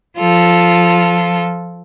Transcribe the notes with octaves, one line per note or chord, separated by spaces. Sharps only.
F3 F4 A4